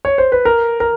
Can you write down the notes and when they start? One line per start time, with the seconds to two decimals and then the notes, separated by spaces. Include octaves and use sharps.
0.05 C#5
0.18 C5
0.32 B4
0.45 A#4
0.80 A#4